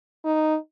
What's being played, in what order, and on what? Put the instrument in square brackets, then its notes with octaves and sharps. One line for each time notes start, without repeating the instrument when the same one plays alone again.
[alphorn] D#4